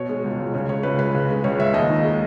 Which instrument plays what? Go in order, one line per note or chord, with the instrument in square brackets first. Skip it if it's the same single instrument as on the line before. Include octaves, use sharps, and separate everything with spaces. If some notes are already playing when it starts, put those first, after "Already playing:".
Already playing: [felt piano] B2 C#5
G#3
C#2
C#2
C#3 C#5
G#3 C#5
C#2 B4
C#2 B4
C#3
G#3
C#2 C#5
C#2 E5
D#2 D#5
D#3
G#3